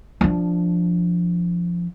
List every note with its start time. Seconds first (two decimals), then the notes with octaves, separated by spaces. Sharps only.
0.21 F3 D4